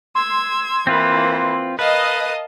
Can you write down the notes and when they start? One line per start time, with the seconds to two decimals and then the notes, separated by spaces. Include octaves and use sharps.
0.15 C6 E6 G#6
0.87 E3 A#3 C4 E4 F4 B4
1.79 A#4 B4 D#5 F5 A5 D#6